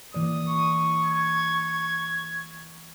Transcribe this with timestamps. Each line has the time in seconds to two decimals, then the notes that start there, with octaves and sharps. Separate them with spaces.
0.14 E3 A#3 D5 D#6
0.48 C#6
1.05 G#6